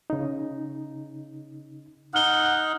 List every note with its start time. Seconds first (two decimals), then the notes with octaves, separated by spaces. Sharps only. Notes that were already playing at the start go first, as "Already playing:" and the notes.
0.10 C#3 D#4
2.14 D#4 F#5 F6 G7